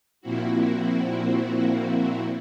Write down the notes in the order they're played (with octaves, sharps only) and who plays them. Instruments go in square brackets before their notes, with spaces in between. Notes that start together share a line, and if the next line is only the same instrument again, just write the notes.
[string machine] A#2 F3 A#3 C4 E4 F#4